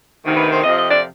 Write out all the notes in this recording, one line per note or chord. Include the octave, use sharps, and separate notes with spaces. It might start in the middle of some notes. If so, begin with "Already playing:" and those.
D2 C3 D#3
B4
C5
F2 C3 F3 D#5
D#5
D5